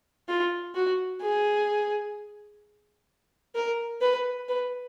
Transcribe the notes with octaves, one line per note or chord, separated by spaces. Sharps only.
F4
F#4
G#4
A#4
B4
B4